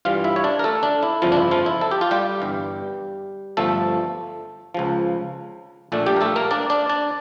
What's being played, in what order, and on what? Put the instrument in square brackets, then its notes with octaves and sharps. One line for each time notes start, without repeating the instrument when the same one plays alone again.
[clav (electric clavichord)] G2 E3 G3 F4 F5
E4 E5
C#5
D4 D5
A#4
A3 A4
D4
E4
G1 F2 C#3 F3 F4
D4
E4
F3 F4
E4
A4
G4
F4
G3 G4
G1 G2 E3
G1 G2 F3 A3 A4
C#2 C#3 F3
A#1 A#2 A3 D4 A4
G3 G4
A#4
A3 A4
A#3 A#4
D4 D5
D4 D5
D4 D5